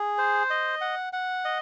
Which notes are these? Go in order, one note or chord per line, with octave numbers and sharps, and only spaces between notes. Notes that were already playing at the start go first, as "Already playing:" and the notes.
Already playing: G#4
C5
D#5
F#5
F#5
D#5